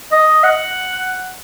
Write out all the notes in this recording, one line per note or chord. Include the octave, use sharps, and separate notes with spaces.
D#5
F#5